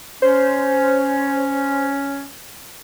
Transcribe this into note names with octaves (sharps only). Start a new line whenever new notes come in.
C#4 C5